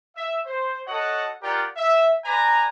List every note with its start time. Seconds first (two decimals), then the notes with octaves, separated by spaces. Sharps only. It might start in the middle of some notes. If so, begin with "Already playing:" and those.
0.16 E5
0.46 C5
0.86 F#4 A4 C#5 D#5 F#5
1.43 F4 G4 A#4 D5 F#5 G5
1.76 E5
2.24 B4 D5 G#5 A#5